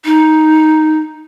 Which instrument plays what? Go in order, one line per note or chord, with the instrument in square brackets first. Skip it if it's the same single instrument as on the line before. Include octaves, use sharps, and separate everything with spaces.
[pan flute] D#4